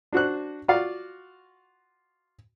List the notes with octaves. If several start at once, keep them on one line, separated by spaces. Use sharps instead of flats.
D4 F#4 C5 F#6
F4 F#4 D5 F5